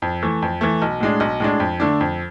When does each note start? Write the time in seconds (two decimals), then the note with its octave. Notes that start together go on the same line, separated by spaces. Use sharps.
0.02 F2
0.23 E3 A3
0.42 F2
0.61 E3 A3
0.82 B1
1.00 A2 G#3 D4
1.20 B1
1.40 A2 G#3 D4
1.60 F2
1.80 D3 A3 D4
2.01 F2